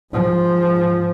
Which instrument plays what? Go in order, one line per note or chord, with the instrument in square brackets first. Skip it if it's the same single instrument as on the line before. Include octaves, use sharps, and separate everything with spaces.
[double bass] G#2 F3